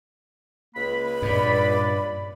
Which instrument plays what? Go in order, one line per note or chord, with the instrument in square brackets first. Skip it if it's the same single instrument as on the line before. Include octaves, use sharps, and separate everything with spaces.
[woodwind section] C#2 A#3 B5
[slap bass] G2 A#2 [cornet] D5